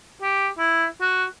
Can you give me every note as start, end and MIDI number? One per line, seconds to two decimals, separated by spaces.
0.22 0.48 67
0.59 0.85 64
1.01 1.24 66